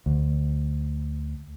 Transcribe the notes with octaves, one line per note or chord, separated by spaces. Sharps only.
D2